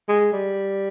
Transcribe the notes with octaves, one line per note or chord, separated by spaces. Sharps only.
G#3
G3